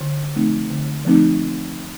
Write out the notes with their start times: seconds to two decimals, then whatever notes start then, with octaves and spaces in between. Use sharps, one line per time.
0.01 D3
0.36 F3 A3 C4 D#4
0.70 D3
1.05 F3 A3 C4 D#4